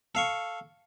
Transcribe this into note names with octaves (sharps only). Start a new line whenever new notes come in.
A4 F5 C#6